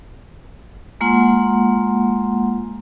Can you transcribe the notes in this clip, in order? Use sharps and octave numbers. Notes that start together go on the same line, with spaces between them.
G#3 A#3 F4 F#5 C6